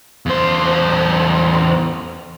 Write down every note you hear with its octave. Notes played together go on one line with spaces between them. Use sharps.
E2 C5